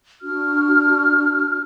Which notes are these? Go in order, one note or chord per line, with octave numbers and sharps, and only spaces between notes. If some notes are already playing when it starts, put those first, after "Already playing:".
D4 F#4 F6